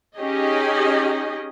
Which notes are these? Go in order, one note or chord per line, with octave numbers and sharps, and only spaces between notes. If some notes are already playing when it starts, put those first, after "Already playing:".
C#4 D#4 G4 G#4 D#5